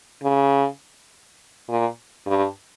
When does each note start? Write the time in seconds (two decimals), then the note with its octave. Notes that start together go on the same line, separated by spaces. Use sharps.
0.23 C#3
1.69 A#2
2.26 G2